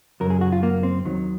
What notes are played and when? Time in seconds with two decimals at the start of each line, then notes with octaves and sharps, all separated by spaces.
0.20 F#2 C#3 F#3 A#4
0.30 G#4
0.41 F#4
0.52 F4
0.63 A#3
0.83 C4
1.05 D#2 D#3 F#3